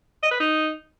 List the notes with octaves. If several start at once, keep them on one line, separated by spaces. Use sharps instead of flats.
D#5
B4
D#4